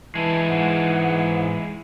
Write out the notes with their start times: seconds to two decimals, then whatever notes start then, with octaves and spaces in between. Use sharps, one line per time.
0.15 E3 G#3 E4 A5
0.49 G#2 F#5